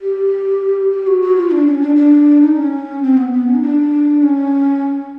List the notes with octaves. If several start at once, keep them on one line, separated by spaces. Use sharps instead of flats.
G4
G4
F#4
F#4
F4
D4
C#4
D4
D4
D#4
C#4
C4
B3
B3
C#4
D#4
D4
C#4